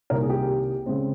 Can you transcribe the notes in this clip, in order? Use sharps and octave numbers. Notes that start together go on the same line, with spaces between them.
C2 C3 D#3 A#3 A#4
G#4
G4
C#3 G#3 C4